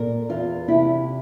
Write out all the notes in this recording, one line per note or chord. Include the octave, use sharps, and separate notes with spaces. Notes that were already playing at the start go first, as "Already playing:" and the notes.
Already playing: A#2 A#4
E2 F4
C3 E4